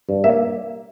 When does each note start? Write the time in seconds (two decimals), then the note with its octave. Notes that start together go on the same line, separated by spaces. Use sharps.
0.09 G2
0.24 A#3 E5